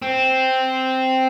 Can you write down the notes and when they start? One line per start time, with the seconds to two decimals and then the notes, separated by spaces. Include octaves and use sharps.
0.02 C4